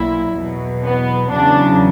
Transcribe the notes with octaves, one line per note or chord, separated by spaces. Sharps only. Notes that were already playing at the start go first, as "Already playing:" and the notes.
Already playing: B1 A#2 F#3 E4
E2 B2 F#3
B3
E2 C#3 F#3 D4